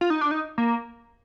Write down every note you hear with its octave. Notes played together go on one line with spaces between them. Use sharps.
F4
D#4
D4
D#4
A#3